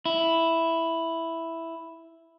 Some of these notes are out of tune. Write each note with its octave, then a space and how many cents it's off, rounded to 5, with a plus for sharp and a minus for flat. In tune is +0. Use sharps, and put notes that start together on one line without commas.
E4 +0